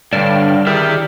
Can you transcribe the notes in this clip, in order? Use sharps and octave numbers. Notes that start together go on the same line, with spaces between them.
G2 D3 C#5 D5 G5 A5 F6
D#3 E4 G4 G#4 D5 E5 F6